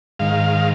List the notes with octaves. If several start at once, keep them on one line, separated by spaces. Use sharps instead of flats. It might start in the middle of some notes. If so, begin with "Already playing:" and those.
G#2 D#3 F5